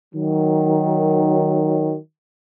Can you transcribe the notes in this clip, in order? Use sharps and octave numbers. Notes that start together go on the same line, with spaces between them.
D#3 F#3